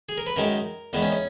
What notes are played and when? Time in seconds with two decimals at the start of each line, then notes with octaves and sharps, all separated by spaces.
0.09 G#4
0.18 A#4
0.26 B4
0.36 F#2 D#3 G#3 A#4
0.93 E2 D#3 G#3 B3
1.02 C#4
1.12 C#4